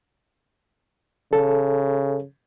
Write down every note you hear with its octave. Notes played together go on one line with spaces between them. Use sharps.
C#3 A4